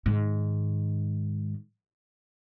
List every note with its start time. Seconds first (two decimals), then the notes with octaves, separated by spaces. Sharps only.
0.06 G#2 D#3